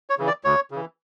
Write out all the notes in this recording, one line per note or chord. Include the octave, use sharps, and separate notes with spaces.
C#5
C#3 E3
D5
D2 C#5
C#3 E3